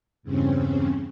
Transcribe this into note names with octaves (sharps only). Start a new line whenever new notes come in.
E2 G2 C#3 C4 C#4